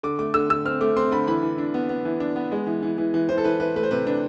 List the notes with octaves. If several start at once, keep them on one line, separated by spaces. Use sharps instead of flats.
D3 D6
A3 D6
D3 E6
D3 E6
C4 F6
A3 D6
C4 C6
D3 B5
E3 B5
E3
D4
B3
B3
E3
D4
B3
G#3
E3
E3
E3
E3
E3 C5
A4
E3 B4
E3 B4
A3 B4
C5
C3 B4
D4 B4